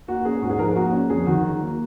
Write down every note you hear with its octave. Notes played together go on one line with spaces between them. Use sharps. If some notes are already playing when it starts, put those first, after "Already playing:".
A#3 F#4
C#4 G#4
G#2 F#4
G#4
F3 A#4
G#4
A#3 F#4
C#4
F2 G#4
D#3 F#4
F#3
A#3